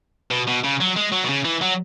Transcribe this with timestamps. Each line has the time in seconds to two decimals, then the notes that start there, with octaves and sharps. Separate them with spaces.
0.31 B2
0.47 B2
0.63 C#3
0.80 F#3
0.96 G#3
1.12 F#3
1.24 B2
1.29 C#3
1.45 E3
1.61 F#3